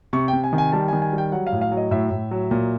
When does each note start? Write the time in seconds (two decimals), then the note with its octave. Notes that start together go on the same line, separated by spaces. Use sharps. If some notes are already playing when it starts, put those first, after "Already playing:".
0.13 C3 C#6
0.28 G5
0.33 C3
0.44 G#5
0.53 D#3
0.58 G#5
0.72 G3 A5
0.88 D#3 G#5
1.02 G#5
1.13 G3 G5
1.32 F#3 F#5
1.47 F5
1.52 A2
1.61 F5
1.71 F#3
1.77 D#5
1.91 A2 E5
2.11 A2
2.31 F#3
2.51 A#2